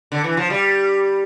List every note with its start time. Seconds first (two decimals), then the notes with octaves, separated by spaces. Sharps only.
0.12 D3
0.24 E3
0.37 F3
0.50 G3